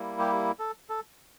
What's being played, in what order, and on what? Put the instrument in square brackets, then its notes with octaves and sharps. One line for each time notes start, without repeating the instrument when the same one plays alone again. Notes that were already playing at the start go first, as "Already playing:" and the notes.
Already playing: [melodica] G3 A#3 E4
G4
A4
A4